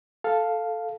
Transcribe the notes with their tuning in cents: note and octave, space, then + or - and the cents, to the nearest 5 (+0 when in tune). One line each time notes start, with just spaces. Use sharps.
A4 +0 F5 +0